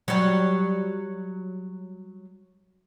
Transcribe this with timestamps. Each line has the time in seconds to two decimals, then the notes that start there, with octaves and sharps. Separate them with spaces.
0.08 F#3 G3